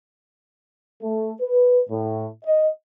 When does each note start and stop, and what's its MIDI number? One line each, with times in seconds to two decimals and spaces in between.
1.02 1.32 57
1.41 1.80 71
1.89 2.27 45
2.46 2.68 75